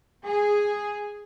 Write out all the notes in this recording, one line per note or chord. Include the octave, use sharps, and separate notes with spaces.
G#4